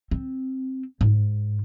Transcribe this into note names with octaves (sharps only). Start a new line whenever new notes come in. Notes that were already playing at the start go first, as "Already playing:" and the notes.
C4
G#2